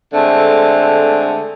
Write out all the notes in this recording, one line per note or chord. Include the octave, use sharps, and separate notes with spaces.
D3 G#3 A3 C4